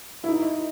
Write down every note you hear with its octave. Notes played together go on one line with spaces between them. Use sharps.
E4
D#4